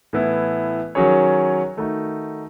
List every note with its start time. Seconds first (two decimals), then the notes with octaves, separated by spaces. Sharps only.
0.13 A2 E3 B3 E4
0.95 D#3 F#3 C#4 G#4 C#5
1.77 D#3 A3 D#4 F#4